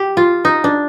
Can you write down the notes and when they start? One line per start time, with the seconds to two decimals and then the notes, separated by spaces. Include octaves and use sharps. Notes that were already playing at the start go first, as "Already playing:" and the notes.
Already playing: G4
0.17 F4
0.45 D#4
0.64 D4